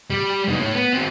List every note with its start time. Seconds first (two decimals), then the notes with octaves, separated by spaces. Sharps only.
0.10 G3
0.48 B3 D#4
0.60 A3 C#5
0.74 B3
0.93 C4 F#4